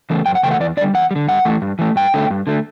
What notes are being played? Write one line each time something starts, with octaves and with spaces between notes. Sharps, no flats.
C#3 E3 A3
F#2 G5
F#5
C#3 E3 A3 G5
F#5
E2 D5
D3 G3 D5
E2 F#5
G3
D3
G2 F#5
E3 A3
G2
E3 A3
G2 G5
D3 A3
G2
D3 A3